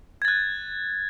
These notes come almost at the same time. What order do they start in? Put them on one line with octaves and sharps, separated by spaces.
G#6 A6 F#6